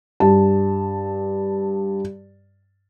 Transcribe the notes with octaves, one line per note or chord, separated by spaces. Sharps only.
G2 A5